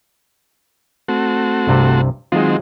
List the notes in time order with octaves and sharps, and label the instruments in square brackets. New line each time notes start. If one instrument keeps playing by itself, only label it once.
[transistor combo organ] A3 C4 F#4
[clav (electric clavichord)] C2 G2 C3
[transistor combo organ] D#3 F#3 C4 [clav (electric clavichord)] G#3 F4